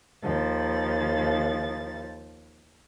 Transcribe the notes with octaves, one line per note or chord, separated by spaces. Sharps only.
D#2 F3 A6